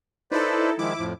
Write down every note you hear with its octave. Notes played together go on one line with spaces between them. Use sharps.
D#4 E4 A4 B4 C5 D5
D#3 F3 G#3 E4 D6
F2 A2 F3